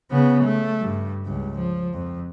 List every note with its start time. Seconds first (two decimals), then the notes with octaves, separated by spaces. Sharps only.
0.11 C#3 B3
0.43 A3
0.81 G2
1.26 C#2 G2
1.58 F3
1.93 F2